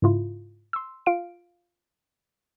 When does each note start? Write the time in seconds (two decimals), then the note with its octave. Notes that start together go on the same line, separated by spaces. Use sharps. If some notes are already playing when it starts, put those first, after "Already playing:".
0.02 G#2 C#3 E4 F4
0.73 C6 E6
1.06 F4 F5 D7